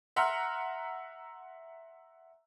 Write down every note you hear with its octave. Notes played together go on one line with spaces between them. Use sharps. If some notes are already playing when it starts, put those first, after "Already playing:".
E5 F#5 A#5 C6 F6